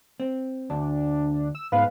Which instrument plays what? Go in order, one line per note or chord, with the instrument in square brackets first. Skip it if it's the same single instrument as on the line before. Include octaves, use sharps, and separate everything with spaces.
[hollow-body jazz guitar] C4
[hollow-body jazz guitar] D2 [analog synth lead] D4
[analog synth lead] E6
[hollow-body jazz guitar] G#2 G#3 B3 [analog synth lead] B4 [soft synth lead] F5